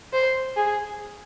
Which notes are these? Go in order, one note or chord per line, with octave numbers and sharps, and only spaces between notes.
C5
G#4